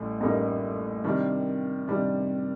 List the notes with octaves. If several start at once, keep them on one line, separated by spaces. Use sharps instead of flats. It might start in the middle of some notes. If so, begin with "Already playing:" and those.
Already playing: A1 A2 G3
A1 A2 G3 A#3 D#4
C3 D#3 G3 D4
C3 D#3 G3 D4